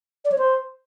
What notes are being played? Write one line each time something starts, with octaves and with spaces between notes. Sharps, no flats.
D5
C#5
C5